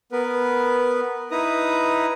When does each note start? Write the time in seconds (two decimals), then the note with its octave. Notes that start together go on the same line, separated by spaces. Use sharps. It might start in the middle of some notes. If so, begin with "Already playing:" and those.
0.12 B3 A#4 B4
1.31 D#4 E4 B4 A#5 D#6